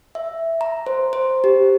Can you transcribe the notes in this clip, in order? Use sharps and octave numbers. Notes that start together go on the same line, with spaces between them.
E5
A#5
C5
C5
G4